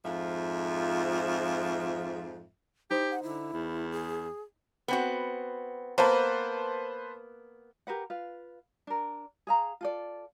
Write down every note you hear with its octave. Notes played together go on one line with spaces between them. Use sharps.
F2 G#2 F3 F4 E5
D#4 E4 G4 C5
F#5
D3 E4
E2
G#4
B3 C4 F#4
A#3 B3 B4 C5 A5
G4 A#4 B4 F#5
F4 B4 F5
D4 A#4
G#4 F5 A#5
F4 A4 D5